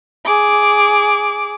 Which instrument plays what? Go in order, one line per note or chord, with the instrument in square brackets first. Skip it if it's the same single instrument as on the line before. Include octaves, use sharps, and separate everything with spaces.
[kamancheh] G#4 D6